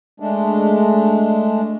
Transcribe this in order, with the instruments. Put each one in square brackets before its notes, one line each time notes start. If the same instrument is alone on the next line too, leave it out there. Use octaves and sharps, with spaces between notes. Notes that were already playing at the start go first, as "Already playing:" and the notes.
[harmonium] G#3 A3 D4